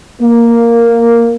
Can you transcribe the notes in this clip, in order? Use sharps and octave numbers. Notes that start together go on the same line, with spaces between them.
A#3